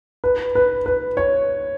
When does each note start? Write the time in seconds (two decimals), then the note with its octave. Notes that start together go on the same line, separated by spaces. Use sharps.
0.24 B4
0.55 B4
0.86 B4
1.17 C#5